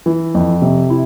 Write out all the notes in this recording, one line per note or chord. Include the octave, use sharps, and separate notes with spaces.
E3
F2
C3
E4